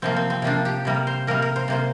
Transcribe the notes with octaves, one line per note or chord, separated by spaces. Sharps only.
C3 F3 A#3 C4
C4
C4
C3 F3 A#3 D4
G4
C3 G3 A#3 A#4
C5
C3 G3 A#3 A#4
A#4
C5
C3 A#3 C5